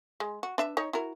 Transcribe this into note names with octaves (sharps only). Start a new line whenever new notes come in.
G#3
F#4
D4 B4 E5
D#4 C#5
E4 F#4 A#4